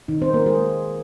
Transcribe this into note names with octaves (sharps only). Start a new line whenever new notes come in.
D#3 D#4
C4 C5
A#3 A#4
G#3 G#4